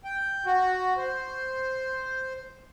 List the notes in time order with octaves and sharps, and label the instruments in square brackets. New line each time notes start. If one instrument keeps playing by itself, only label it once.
[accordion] G5
F#4
C5